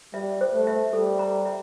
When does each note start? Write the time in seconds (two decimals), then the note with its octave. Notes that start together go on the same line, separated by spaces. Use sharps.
0.14 G3 E5
0.41 C5
0.53 A3
0.67 E5
0.93 G3 A4
1.19 A#5
1.46 E5